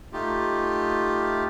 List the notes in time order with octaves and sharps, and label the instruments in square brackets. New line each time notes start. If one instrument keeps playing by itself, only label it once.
[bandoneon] A3 D#4 F4 G4